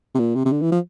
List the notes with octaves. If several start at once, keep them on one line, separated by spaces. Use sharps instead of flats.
C3
A#2
C3
C3
D3
E3
F3